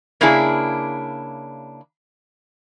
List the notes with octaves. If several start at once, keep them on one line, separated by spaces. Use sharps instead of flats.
C#3 A#3 D4 E4 G#4